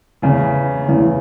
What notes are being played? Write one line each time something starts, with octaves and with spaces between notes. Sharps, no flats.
E2 C#3 E3
E2 C#3 E3